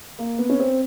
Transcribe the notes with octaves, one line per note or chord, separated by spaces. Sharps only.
A#3
B3
C#4
C4